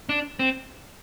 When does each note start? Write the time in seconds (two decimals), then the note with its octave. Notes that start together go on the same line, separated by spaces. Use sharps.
0.09 D4
0.39 C4